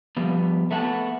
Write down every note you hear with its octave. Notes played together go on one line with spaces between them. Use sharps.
F3 G3 B3
A3 B3 F#5 G#5 A5